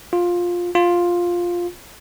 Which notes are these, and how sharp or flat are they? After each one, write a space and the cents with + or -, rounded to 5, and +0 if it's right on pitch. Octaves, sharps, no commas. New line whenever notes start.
F4 +10
F4 +5